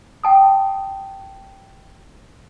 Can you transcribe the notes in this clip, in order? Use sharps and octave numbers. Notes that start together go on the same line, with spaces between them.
G5 A5 D#6